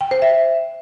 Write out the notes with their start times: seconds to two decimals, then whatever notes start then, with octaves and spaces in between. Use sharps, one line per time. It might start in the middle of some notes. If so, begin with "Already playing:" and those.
0.01 G5
0.11 C5
0.22 E5